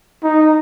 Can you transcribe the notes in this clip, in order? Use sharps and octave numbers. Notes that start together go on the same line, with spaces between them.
D#4